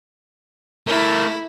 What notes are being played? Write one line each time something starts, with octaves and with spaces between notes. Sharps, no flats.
A3 E4 A#4